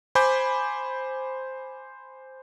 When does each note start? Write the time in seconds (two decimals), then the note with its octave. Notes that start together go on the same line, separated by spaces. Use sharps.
0.15 C5 G#5 B5 D6 G6